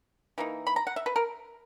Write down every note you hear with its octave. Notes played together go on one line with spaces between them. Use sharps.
E3 A#3 D#4
B5
A#5
F#5
E5
B4
A#4